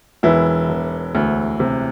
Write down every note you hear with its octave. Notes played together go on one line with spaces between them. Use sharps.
E1 E3 E4
E1
D2
C3